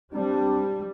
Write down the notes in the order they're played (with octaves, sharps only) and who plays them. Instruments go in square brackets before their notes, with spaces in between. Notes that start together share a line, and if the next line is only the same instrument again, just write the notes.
[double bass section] G3 [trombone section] C4 D4